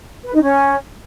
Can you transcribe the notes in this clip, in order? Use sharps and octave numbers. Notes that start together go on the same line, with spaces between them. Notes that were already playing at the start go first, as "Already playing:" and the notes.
B4
D#4
C#4